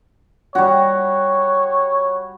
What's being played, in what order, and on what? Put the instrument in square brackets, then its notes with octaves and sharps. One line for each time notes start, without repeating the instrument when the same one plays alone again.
[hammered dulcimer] G3 F#4 [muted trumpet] C#5